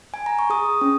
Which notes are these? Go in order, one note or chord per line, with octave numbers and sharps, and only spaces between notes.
G#5
A#5
C#6
G#4 D#6
C#4